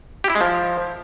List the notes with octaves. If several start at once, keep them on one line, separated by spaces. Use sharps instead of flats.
G4
E4
G#3
F3